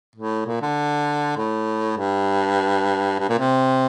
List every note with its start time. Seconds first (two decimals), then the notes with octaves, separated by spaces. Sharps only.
0.16 A2
0.46 A#2
0.62 D3
1.37 A2
1.97 G2
3.19 G2
3.29 A#2
3.39 C3